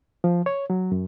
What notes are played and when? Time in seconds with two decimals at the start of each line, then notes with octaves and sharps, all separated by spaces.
0.24 F3
0.46 C#5
0.70 F#3
0.92 F#2